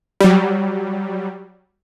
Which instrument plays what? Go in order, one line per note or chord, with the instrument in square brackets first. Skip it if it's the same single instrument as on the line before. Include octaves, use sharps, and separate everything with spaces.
[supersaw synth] F#3 G3